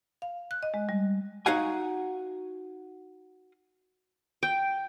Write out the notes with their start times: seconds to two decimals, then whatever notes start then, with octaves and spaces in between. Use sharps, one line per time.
0.22 F5
0.51 F#6
0.63 D#5
0.74 G#3
0.89 G3
1.46 D#4 F#4 F5 F#5 G#5
4.43 G5